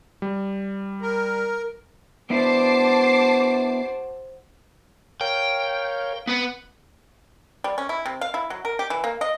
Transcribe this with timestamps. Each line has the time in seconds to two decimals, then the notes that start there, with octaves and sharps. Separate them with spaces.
0.22 G3
1.02 A#4
2.30 B3 D4 E4 F#4 C5 A5 D6 C7
5.21 A#4 C#5 F5 G5
6.27 B3 B4 F#5
7.64 G3
7.78 C#4
7.89 E4
8.06 C3
8.21 F5
8.34 E4
8.50 F#3
8.65 A#4
8.79 G4
8.90 E3
9.04 A#3
9.21 D#5